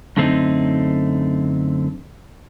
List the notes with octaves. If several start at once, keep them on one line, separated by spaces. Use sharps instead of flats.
F#2 D3 A3 C4 C#4 D#4